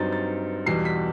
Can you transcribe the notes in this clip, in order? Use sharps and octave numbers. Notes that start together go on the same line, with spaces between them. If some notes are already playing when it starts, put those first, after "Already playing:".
Already playing: G2 F#3 C4 D#4 A6
A6
E2 B2 G3 C7
B6